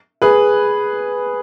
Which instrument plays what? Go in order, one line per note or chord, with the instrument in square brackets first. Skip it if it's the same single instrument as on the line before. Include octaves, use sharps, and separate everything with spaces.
[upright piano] G#4 B4